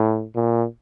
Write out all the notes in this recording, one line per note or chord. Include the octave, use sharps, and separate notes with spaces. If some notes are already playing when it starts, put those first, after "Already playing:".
Already playing: A2
A#2